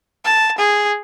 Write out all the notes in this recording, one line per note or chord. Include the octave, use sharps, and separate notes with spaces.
A5
G#4